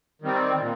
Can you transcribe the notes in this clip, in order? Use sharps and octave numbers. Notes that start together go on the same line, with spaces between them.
D#3 G3 C4
A#2